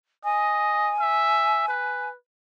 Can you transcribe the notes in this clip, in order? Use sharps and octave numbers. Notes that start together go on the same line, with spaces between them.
D#5 G#5
E5
B4